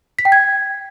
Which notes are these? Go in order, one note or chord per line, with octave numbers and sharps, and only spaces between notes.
B6
G5
G#6